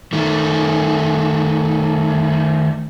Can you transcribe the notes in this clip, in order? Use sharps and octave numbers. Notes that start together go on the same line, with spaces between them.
D#3 A3